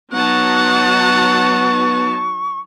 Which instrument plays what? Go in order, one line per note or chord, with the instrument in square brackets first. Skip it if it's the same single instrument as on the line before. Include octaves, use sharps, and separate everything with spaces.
[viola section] F#3 D#4 A5 [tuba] B3 [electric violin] F#5 [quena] C#6